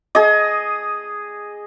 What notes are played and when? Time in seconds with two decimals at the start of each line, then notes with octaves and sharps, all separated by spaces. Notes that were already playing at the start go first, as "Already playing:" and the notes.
0.15 G#4 D#5